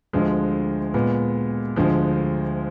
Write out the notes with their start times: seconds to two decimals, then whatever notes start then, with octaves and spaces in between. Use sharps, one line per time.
0.13 D2 D3 F3 G#3
0.94 A#2 G#3 B3
1.76 D2 D3 F3 G#3